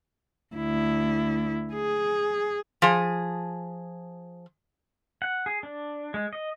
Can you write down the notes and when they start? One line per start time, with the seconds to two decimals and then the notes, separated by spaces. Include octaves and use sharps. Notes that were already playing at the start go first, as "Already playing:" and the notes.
0.55 D2 E4
1.73 G#4
2.82 F3 G#4
5.22 F#5
5.46 G#4
5.63 D4
6.14 G#3
6.33 D#5